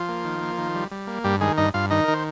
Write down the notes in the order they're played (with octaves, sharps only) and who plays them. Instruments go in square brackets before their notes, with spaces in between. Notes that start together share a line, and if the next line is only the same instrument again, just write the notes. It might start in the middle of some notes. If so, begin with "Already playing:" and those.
Already playing: [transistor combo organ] F3 F4
A#3
D#3
A#3
D#3
G3
G3
A#3
G2 G3 G4
D#3 G#3 G#4
G2 D#4 D#5
G2 F4 F5
D#3 D#4 D#5
D#3 A#4
C5